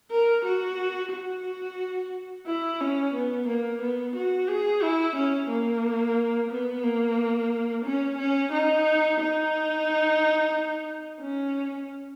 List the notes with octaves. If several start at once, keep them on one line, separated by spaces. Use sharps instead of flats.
A#4
F#4
F#4
E4
C#4
B3
A#3
B3
F#4
G#4
E4
C#4
A#3
B3
A#3
C#4
C#4
D#4
D#4
C#4